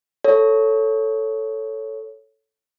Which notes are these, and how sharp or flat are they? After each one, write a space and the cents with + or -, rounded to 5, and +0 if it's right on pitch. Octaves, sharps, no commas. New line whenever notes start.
A4 +0 C#5 +0